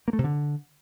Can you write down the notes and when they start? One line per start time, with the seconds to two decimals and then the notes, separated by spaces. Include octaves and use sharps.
0.08 A#3
0.13 A3
0.19 C3
0.24 D3